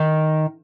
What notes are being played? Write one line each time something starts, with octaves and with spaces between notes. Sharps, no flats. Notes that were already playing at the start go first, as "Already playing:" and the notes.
Already playing: D#3